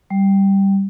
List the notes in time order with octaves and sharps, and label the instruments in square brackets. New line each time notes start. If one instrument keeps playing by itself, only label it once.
[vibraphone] G3